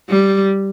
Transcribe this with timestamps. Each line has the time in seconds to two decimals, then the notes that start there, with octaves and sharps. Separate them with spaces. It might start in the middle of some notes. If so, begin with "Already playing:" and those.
0.09 G3